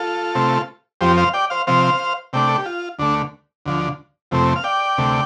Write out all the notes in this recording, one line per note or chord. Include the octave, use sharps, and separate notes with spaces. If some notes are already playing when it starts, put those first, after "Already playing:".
Already playing: F4 A4
C3 A3 C4
F2 F3 C4 G4 C5
C5 F5
D5 G5
C5 F5
C3 F3 C4 C5 F5
C3 A3 D4 D5 G5
A4
G4
F4
D2 D3 A3 D4
D2 D3 F3
F2 C3 A3 C4
F5
D5 G5
D2 C3 A3